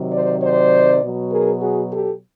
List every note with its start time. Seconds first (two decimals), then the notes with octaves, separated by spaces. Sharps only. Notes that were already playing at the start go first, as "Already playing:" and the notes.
Already playing: C3 D#3 F#3
0.12 C5 D5
0.42 C5 D5
1.02 B2 F#3
1.31 G#4 A#4
1.61 F#4 G#4
1.90 G4 A4